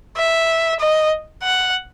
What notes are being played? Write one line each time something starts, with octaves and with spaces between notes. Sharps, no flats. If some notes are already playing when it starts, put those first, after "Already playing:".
E5
D#5
F#5